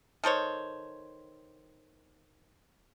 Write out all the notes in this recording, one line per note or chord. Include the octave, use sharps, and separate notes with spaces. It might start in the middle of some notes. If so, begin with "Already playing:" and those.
D#3 A4 C5 C#5